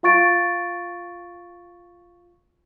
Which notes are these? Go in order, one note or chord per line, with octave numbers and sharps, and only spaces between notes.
F4 F5 C#6 A6 D7